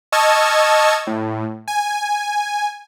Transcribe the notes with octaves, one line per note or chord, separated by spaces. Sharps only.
D#5 A5 C#6 E6 F6 G#6
A2
G#5